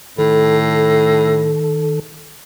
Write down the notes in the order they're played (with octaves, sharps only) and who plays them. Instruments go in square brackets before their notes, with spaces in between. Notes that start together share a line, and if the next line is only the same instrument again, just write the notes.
[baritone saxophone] A2 [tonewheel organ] D#3 A4